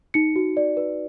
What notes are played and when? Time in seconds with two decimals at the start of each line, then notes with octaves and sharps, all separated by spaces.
0.14 D#4 C#7
0.36 F#4
0.57 D5
0.77 B4